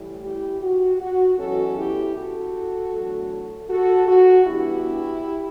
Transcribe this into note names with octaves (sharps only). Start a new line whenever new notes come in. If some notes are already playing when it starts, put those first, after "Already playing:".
Already playing: A2 E3 G3
E4 G4
F#4
F#4
E2 B2 F#3 C#4 F#4 A4
E4 G4
F#4 A4
E2 D3 F#3 A3
F#4 A4
F#4
G2 E3 B3 D4 E4 G4